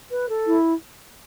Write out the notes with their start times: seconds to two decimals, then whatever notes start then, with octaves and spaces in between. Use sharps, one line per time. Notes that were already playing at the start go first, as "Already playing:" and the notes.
0.11 B4
0.29 A4
0.47 E4